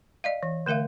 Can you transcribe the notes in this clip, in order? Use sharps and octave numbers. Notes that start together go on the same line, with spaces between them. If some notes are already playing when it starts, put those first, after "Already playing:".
D5 D#5 F5
E3
D3 A3 A#4 E5 F5